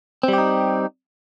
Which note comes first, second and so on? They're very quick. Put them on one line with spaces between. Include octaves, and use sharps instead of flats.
C4 G3 G4 D#4